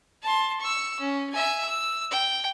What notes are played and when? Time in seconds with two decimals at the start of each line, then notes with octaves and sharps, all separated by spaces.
0.23 A5 C6
0.60 C#6 E6
1.00 C#4
1.32 E5 G#5
1.65 E6
2.11 G5